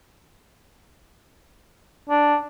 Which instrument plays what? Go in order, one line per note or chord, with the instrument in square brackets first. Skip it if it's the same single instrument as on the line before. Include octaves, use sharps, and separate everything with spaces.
[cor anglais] D4